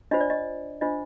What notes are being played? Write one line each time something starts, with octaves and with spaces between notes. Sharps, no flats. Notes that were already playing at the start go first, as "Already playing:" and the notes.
D4 F4 C5 D#5
D5
D#5
D4 F4 C5 D#5